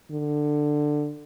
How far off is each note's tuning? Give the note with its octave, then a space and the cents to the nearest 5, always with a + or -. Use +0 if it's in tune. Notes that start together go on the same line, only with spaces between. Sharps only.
D3 +15